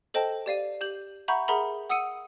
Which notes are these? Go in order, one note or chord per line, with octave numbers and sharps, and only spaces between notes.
A4 C5 D#5 G5 A5
G4 D5 F5 D#7
G4 G6 F#7
E5 F#5 A#5 B5 C#6 G6
G#4 A#4 E5 F#5 A#5 B5
F#5 D#6 E6 C#7 D#7